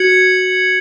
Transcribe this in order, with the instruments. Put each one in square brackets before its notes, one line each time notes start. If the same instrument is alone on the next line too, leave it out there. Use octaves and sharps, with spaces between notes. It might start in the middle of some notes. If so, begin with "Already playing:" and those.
Already playing: [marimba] F#4 [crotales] G#6 C#7 F#7